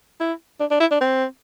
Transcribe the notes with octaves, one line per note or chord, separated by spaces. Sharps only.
E4
D4
D4
E4
D4
C4